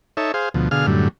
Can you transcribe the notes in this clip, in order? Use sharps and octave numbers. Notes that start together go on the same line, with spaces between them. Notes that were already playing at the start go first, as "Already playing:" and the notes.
D#4 A4 C#5 E5
G#4 C5 F5
D2 B2 F3
B2 D3 G#4 F5 F6
F#2 A2 D3 G3